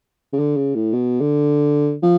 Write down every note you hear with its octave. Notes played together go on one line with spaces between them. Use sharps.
C#3
D3
C#3
A2
B2
D3
F3